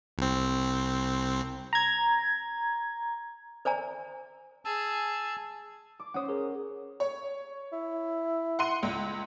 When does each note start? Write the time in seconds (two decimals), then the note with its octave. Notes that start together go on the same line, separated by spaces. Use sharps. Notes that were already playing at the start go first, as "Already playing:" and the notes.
0.18 C2 C4
1.73 A#5 G#6
3.65 C5 D5 G#5 A#5
4.65 G#4 A5 E6
6.00 D6
6.14 C#4 C5 F#5 D#6
6.28 G#4 A#4
7.00 C#5
7.73 E4
8.59 F#5 C6 D#7
8.83 C#2